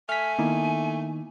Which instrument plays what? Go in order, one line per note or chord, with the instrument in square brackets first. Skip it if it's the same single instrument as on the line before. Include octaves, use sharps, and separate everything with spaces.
[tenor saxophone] A3 [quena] G#5 [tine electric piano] F6 B6
[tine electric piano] D#3 D#4 [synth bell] A#3 B3 E4